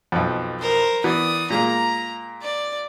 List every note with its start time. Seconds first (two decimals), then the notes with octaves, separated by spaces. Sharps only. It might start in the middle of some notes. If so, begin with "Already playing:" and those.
0.12 B1 F2
0.59 A#4 C5
1.04 E3 B3 D5 D#6
1.50 A#2 G#3 A#3 A#5
2.42 D5